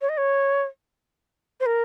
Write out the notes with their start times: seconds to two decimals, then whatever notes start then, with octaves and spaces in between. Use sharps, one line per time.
0.01 C#5
0.09 D#5
0.17 C#5
1.60 C5
1.66 A#4